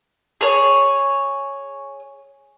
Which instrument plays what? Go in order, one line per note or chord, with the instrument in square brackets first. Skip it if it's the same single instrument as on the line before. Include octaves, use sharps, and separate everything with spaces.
[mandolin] G#4 C#5